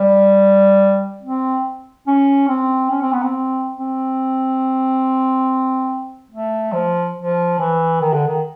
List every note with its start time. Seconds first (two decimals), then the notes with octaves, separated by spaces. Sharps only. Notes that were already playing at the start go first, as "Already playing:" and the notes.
Already playing: G3
1.22 C4
2.07 C#4
2.49 C4
2.91 C#4
3.02 C4
3.12 B3
3.23 C4
3.76 C4
6.31 A3
6.73 F3
7.16 F3
7.59 E3
8.01 D#3
8.13 D3
8.27 D#3